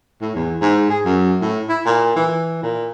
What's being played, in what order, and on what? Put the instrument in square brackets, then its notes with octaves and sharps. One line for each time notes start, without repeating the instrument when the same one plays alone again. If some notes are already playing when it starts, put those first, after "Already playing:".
[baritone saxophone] A2
E2
G#2
G#4
F#2
A2
E4
A#2
E3
A#2